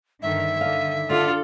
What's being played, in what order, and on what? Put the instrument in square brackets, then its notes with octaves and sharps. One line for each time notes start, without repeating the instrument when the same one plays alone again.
[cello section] G2 D3 D#3 [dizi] E5
[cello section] D3 D#3 [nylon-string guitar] F5
[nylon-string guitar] D3 [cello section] D4 A4 [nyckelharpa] F4